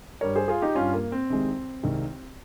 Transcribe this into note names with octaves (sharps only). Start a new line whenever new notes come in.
G2 G3 A#4 C#5
G#4 C5
F4 G#4
D#4 G4
G2 G3 C#4 F4
A#3
C4
C2 C3 D#3 G#3
C2 C3 D#3 G#3